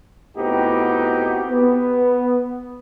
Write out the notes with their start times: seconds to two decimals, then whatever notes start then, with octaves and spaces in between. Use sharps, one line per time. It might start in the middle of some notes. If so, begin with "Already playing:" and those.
0.37 A2 B3 C4 D#4 F#4 G4
1.50 B3